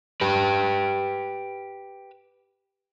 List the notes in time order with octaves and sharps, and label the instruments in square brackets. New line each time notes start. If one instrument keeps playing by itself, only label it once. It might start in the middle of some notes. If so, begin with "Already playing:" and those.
[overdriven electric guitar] G4 B4